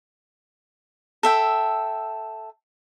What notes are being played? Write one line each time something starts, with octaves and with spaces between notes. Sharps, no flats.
A4 E5 G5